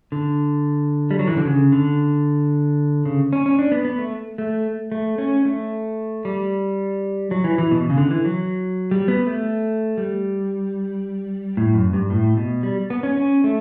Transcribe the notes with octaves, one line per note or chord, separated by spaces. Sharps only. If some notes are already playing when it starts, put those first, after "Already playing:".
D3
G3
F#3
E3
D3
C#3
D3
C#3
C#4
C#4
D4
B3
B3
A3
A3
A3
C#4
A3
G3
F#3
E3
E3
B2
C#3
D3
E3
F#3
G3
B3
A3
G3
A2
F#2
G2
A2
B2
G3
B3
C#4
C#4
A3